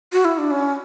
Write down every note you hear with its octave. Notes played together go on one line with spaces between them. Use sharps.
F#4
E4
D4
C#4